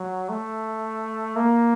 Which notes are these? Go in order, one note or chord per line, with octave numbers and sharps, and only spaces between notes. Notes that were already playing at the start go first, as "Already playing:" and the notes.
Already playing: F#3
A3
A#3